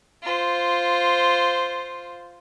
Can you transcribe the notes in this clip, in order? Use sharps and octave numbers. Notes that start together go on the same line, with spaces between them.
F4 C5